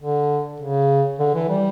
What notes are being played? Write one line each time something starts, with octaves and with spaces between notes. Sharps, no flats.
D3
C#3
D3
E3
G3